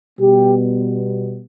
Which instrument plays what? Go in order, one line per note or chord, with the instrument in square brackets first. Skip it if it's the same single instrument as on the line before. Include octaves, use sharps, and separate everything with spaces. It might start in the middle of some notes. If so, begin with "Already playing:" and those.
[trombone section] B2 G3 B3 G4